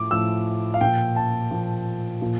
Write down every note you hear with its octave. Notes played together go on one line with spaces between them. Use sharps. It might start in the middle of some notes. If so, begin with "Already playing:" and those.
Already playing: A2 F3 D6
A2 F3 E6
F5
A#2 F3 G5
A5
A#2 F3
A#2 F3